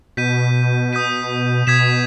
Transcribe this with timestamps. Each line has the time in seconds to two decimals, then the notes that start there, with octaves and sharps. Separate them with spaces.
0.17 B2 G6 B6 D#7
0.93 D#6 G6 B6 D#7
1.67 B2 D#6 G#6 B6 E7